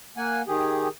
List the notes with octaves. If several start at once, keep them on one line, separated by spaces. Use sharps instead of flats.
A#3 F#5 G#5
D#3 G4 G#4